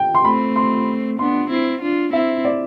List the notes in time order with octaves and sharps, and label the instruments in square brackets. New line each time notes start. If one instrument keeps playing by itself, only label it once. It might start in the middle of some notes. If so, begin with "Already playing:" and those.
Already playing: [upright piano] G5
C6
[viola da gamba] A3 C4 [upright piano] B5
[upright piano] C6
[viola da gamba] B3 D4 [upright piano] C6
[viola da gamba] C4 E4
D4 F4
[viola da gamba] C4 E4 [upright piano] E5
[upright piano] D5